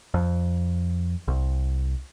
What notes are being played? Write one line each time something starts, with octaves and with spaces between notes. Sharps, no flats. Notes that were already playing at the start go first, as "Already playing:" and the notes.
F2
C2